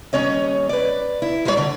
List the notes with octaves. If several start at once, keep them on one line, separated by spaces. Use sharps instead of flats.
D#2 G3 C#4 C#5 D#5
B4 D5
E4
G3 G#3 E4 G4 C#5 D5
D3 D4